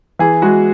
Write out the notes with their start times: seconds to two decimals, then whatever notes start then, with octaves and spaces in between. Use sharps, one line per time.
0.19 E3 G#4
0.42 G#3 F#4